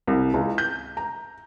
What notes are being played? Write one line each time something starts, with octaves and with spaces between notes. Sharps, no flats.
C2
C#2
G6
A#5